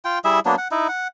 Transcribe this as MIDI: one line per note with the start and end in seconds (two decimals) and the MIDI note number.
0.05 0.19 65
0.05 0.19 79
0.24 0.40 55
0.24 0.40 64
0.24 0.40 68
0.24 0.40 76
0.45 0.55 54
0.45 0.55 58
0.45 0.55 59
0.45 0.55 62
0.58 0.68 78
0.71 0.87 63
0.71 0.87 64
0.89 1.08 78